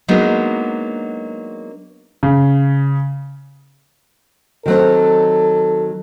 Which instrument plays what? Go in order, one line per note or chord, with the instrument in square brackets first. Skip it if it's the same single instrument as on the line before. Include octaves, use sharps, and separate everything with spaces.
[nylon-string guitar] F#3 G#3 A#3 B3 D4 D#4
[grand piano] C#3
[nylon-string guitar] D#3 F#3 C4 [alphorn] A4